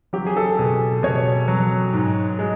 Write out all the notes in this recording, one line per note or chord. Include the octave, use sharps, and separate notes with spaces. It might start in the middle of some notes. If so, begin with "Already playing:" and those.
F#3 G4
G#4
A4
B2 G#4
B2 C#5
F#3
G#2
G#3